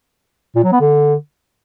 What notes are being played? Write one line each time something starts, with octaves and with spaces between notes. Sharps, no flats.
A#2
F#3
B3
D3